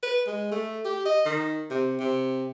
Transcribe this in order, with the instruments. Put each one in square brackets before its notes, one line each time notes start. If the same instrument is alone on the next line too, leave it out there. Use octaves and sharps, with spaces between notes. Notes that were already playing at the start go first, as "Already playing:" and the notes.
[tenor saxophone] B4
G#3
A3
G4
D#5
D#3
C3
C3